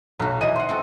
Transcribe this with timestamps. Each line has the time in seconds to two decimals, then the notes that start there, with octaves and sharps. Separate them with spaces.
0.19 B1 F#3 F#4
0.41 E3 D#5 D#7
0.56 C5 F#5 C6
0.69 C4 F#4 A4